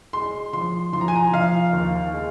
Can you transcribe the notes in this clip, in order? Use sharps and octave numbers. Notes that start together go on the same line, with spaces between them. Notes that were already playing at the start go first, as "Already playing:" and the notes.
G#3 C6
F3 C6
F3 C6
A#5
G#5
A#5
F3 F5
D#2
G#3